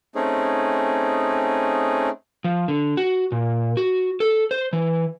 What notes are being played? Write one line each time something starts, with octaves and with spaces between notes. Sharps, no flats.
A3 C4 C#4 D#4 G#4
F3
D3
F#4
A#2
F#4
A4
C5
E3